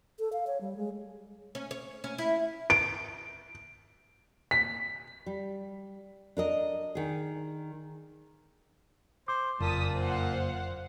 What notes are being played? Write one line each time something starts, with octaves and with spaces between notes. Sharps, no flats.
A4
F5
C#5
G3
G#3
C#4
C#5
C#4
E4
D7
B6
G3
D4 A#4 D#5
D#3 G#4
C5 D6
F#1 F2 A#2 A5 D#6 B6
C5 F5 F#5